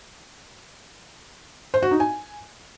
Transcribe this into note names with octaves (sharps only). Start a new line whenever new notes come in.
C5
F#4
D#4
G#5